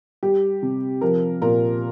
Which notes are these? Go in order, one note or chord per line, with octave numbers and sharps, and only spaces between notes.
G3 G4
C3
F3 A#4
A#2 A#4